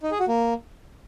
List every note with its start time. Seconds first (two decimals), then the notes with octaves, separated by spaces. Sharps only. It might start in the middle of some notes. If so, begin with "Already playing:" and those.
0.03 D#4
0.11 G#4
0.20 F#4
0.28 A#3